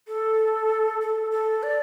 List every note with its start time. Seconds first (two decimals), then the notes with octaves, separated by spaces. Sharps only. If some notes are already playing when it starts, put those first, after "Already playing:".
0.07 A4
1.01 A4
1.31 A4
1.63 D5